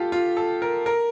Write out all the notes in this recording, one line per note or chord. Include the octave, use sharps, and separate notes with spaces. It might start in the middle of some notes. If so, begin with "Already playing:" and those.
Already playing: F4 G4 A4
F4
A4
A#4
A#4